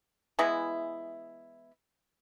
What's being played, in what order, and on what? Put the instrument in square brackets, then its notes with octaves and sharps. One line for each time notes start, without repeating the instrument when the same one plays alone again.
[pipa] E3 G#3 B3 E4